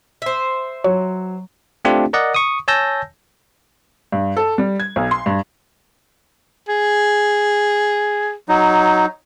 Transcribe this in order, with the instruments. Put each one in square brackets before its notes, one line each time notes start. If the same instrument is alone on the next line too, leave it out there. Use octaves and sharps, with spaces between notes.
[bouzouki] C5 E5
[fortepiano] F#3 [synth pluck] C#5
[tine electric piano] A3 C4 D4 F4 G4
A#4 D5 D#5 F#5
C#6 D#6
C#5 G#5 A5 E6 G6 A#6
[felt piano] G2
A4
G3
G#6
B1
C6
G2
[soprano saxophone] G#4
[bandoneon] F#3 D#4